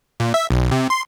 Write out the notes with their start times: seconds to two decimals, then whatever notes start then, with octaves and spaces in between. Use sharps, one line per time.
0.20 A#2
0.34 E5
0.50 B1
0.71 C3
0.90 C6